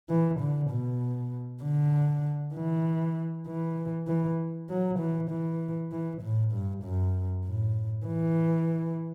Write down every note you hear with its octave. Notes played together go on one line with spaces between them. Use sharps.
E3
D3
B2
D3
E3
E3
E3
F#3
E3
E3
E3
A2
G2
F#2
A2
E3